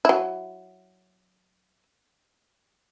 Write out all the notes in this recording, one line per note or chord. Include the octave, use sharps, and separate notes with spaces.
F#3 E4